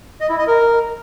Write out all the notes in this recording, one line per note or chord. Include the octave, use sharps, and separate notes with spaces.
D#5
E4
D#5
A#4